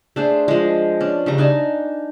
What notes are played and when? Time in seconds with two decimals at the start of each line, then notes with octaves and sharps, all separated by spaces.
0.16 A3 D4 G#4 C5
0.48 F3 G#3
1.01 C#4 D4
1.26 C#3 G3 A3 A#5
1.38 D4 D#4 G#5 A5